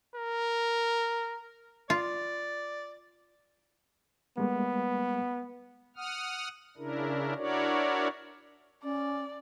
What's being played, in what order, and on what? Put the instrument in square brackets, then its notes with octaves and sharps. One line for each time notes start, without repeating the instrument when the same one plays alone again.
[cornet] A#4
[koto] F4 [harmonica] D5
[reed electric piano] G3 G#3 A#3 [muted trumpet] B3
[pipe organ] F#5 D#6 F6
C#3 D4 E4 A#4
D4 E4 F#4 A#4 C#5 D5
[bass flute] C#4 [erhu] D5